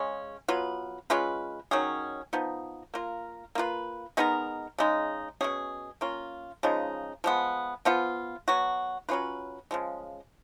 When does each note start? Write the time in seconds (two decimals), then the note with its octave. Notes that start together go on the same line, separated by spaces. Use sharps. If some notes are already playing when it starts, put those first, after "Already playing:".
Already playing: C#3 G#3 C#4
0.48 F#3 B3 F4 B4
1.10 G#3 C#4 F4 B4
1.71 D#3 F#3 C#4 G#4
2.33 F3 B3 D#4
2.94 A#3 F4 A#4
3.55 A#3 F4 B4
4.17 G#3 B3 D#4 A#4
4.78 C#3 G#3 D#4
5.41 B2 G#3 C#4 G#4
6.01 A#3 C#4 F4
6.63 C#3 F3 G#3 D#4
7.24 F3 G#3 B3
7.85 F3 B3 F4
8.48 F#3 B3 F#4
9.09 F#3 C#4 F4 B4
9.71 C#3 F3 G#3